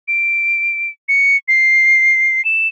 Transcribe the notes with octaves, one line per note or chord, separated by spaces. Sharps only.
D7
C#7
C7
E7